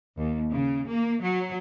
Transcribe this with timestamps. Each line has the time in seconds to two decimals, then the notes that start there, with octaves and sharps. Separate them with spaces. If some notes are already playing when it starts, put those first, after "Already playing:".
0.18 D#2
0.50 C#3
0.89 A#3
1.21 F#3